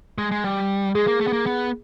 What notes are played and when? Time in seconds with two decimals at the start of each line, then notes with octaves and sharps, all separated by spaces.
0.18 G#3
0.32 G#3
0.44 G3
0.95 G#3 G#4
1.07 A#3
1.21 A3
1.27 B3
1.33 A#3
1.46 B3